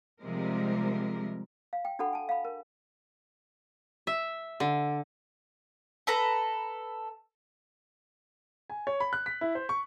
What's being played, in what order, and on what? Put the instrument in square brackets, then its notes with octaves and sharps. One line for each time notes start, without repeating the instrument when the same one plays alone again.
[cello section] C3 F3 G3 G#3 A#4
[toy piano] F5
G5
D4 F#4 A4 F#5 B5
G#5 A5
F5 B5
A#4
[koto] E5
D3
[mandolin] A4 B4 A#5
[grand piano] G#5
C#5
B5
F#6
B6
E4
C5
C#6